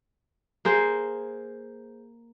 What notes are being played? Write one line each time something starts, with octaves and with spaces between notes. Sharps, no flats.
A#3 G#4 C5